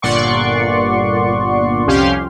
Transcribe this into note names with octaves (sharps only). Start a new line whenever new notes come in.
G1 A#2 D5 F#5 C6 C#6
C2 F2 C#4 G4 F5 C6